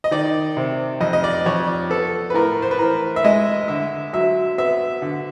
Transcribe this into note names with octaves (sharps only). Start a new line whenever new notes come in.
D#5
D#3 D5
C3
F2 D#5
D#5
D5
F2 C#5
D5
B3 A4
B4
A2 A#4
C5
B4
E3 A#4
E5
G#3 D#5
D3 E5
F#3 E5
B3 E5
D3